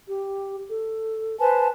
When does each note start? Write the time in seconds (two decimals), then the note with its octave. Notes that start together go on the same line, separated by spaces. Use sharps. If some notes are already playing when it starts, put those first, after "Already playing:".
0.08 G4
0.70 A4
1.40 B4 C5 G#5 A5